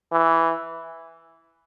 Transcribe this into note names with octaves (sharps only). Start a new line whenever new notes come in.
E3